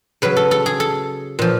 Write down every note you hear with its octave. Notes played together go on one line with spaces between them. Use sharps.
C#3 F#3 B4
A4
A4
G#4
A4
A#2 F3